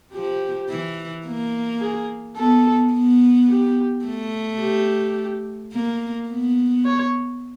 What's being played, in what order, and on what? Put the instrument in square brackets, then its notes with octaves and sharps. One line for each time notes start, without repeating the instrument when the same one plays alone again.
[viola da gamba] F3 [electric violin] G4
[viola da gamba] E3
A#3
[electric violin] G#4
[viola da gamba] B3 [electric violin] A4
[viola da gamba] B3
[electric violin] G4
[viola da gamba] A3
[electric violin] G4
[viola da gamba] A#3
B3
[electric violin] C#5